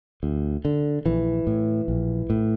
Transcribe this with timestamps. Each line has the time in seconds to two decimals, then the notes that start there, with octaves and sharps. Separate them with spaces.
0.23 D2
0.65 D3
1.06 A#1 E3
1.47 A2
1.88 A#1
2.30 A2